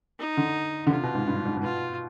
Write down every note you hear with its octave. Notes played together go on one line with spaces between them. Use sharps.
D#4
D3
D3
C3 F4
B2
G#2
G2
G#2
G#2
B2 F4